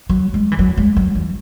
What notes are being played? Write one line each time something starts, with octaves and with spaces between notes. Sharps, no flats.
F#3
G#3
E3
F#3
G#3
F#3
E3